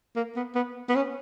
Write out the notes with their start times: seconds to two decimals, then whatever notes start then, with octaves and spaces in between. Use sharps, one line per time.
0.16 A#3
0.36 B3
0.55 B3
0.89 B3
0.96 C#4